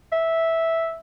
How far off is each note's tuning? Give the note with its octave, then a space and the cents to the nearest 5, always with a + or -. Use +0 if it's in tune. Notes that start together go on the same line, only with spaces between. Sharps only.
E5 -5